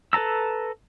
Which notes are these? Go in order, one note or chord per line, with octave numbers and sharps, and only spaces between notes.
A4 B4 A5 A#5 E6